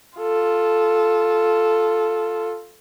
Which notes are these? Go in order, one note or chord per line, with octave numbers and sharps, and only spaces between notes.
F4 A4